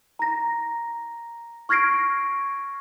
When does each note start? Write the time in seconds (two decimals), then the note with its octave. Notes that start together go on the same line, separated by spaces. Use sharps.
0.19 A#5 A#6
1.69 C#6 F6 G#6 A#6 C7 D7